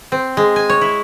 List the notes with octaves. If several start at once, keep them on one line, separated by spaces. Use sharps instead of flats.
C4
G#3
G#5
C#5
E4